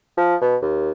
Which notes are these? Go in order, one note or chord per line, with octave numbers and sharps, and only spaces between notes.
F3
B2
D#2